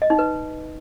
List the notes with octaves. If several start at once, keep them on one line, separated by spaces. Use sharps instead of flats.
D#5
D#4
B4